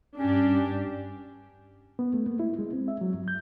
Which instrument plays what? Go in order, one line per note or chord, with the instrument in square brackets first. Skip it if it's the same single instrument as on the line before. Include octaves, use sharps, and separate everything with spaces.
[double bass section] G2 [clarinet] C#4 [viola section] D4 G4
[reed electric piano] B3
A3
A#3
E4
G#3
C4
E5
F#3
G2
G6